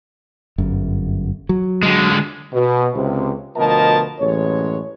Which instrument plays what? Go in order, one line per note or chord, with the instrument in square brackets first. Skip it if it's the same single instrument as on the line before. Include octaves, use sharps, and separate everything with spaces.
[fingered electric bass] G1 F#2
F#3
[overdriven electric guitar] D3 G#3
[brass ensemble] B2
C#2 C3
D2 B2 F3 A#4 D#5 A5
A1 F#2 G#3 C#5